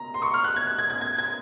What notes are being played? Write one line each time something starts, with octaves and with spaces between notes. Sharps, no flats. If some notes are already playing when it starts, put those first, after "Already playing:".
Already playing: A#5
C6
C#6
F6
F#6
G#6
F#6
G#6
G#6
G#6
G#6